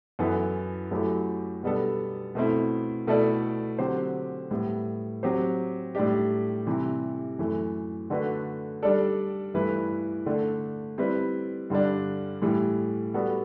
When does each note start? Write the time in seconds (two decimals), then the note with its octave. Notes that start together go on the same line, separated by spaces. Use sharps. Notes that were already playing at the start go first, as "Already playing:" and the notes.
0.19 F#2 E3 B3 E4 A4
0.91 F#2 F#3 A3 E4 G4
1.63 B2 G3 B3 D4 A4
2.35 B2 A3 C4 E4
3.07 B2 A3 E4 A4 D5
3.78 D3 F#3 C4 G4 C5
4.51 A2 G3 B3
5.23 F#3 C4 G4 C5
5.95 A2 G3 D4 G4
6.67 C3 E3 G3
7.39 F#2 E3 A3
8.10 D3 A3 D4 F#4 B4
8.82 G3 D4 A4 D5
9.54 G2 E3 A3 E4 B4
10.26 D3 A3 D4
10.98 G3 C4 E4 B4 D5
11.70 G2 D3 G3 D4
12.42 A2 E3 G3
13.14 G3 B3 F#4 A4 D5